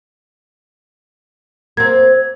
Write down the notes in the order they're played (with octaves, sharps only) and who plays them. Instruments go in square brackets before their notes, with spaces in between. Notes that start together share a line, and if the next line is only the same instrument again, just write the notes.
[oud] A#3 C4 [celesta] G#6